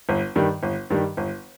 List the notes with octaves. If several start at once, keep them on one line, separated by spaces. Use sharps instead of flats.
G1
G2 D#3 G3
G1
G2 D#3 G3
G1